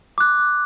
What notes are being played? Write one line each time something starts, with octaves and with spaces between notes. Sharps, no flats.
D6 F#6